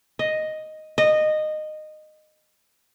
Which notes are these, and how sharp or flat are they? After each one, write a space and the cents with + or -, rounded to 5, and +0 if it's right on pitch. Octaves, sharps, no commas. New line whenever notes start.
D#5 +0
D#5 -15